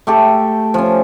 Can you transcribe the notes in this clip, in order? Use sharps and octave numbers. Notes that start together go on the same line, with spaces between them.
A3 G4 A4
F3 C#4